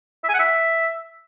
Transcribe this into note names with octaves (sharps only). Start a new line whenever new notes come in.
E5
G#5
F#5
E5